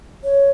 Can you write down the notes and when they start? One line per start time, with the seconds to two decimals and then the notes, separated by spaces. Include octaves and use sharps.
0.24 C#5